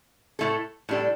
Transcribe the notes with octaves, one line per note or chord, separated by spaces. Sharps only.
A2 A3 E4 A4
A2 G3 D4 A4